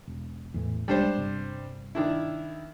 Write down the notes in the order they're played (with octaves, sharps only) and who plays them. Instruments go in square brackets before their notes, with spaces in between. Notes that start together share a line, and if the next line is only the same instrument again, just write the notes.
[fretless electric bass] E1
E2 A2 E3
[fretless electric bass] B1 G#3 [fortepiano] G3 D4 C5
[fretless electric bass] G1 C3
[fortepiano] D#3 D4 E4